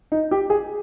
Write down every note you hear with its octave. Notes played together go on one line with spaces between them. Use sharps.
D#4
G4
G#4